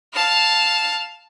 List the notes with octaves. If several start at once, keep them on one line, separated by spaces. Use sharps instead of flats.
F5 A5